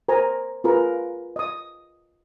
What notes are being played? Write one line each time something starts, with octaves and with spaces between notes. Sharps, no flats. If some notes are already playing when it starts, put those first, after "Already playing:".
A#4 C5 G#5 A#5
F4 G#4 A#4 B4
D#5 D#6